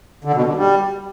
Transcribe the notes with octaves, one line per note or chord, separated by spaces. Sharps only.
D3
B2
D3
G3